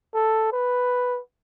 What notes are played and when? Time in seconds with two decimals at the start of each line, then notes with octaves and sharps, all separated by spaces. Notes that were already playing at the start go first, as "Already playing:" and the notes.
0.14 A4
0.52 B4